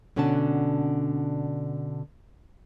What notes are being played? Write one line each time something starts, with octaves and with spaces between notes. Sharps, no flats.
B2 D3 C#4 D4 F#5 A5